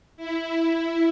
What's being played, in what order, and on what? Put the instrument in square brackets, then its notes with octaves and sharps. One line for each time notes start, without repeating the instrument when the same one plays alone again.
[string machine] E4